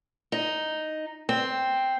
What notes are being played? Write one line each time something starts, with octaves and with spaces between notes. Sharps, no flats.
D#4
C4